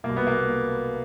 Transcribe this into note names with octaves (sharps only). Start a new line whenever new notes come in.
B2 A#3
C2
B3
A#3